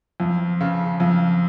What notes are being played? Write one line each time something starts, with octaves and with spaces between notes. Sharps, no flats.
F2
C#3
F2